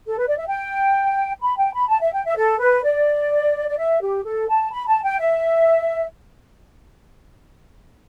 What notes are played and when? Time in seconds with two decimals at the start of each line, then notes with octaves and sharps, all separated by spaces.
0.07 A4
0.18 B4
0.28 D5
0.38 E5
0.47 G5
1.42 B5
1.57 G5
1.74 B5
1.89 A5
2.01 E5
2.13 G5
2.25 E5
2.36 A4
2.60 B4
2.84 D5
3.69 D5
3.78 E5
4.01 G4
4.25 A4
4.49 A5
4.72 B5
4.87 A5
5.03 G5
5.19 E5